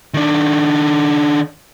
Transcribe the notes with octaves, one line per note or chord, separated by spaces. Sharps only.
D#3 D4